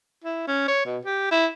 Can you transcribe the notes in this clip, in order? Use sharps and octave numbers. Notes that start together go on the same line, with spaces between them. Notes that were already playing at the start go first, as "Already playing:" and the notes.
E4
C#4
C#5
B2
G4
E4